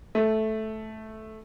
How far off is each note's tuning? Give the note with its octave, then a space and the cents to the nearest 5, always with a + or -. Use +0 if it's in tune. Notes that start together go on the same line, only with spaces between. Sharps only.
A3 -10